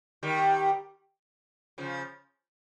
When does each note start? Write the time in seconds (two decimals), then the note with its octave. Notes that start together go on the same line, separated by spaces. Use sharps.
0.23 D#3 G3
1.78 C#3 F3